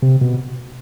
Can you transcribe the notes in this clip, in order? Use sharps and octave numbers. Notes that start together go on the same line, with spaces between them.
C3
B2